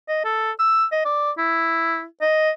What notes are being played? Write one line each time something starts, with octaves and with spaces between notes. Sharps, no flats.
D#5
A4
E6
D#5
D5
E4
D#5